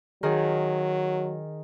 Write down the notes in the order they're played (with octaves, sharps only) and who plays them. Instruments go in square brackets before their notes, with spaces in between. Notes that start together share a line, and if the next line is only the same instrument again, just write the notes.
[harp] D#3 G#4 [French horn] F#3